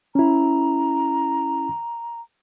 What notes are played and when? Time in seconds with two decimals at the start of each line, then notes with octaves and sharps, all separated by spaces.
0.15 C#4 E4 A#5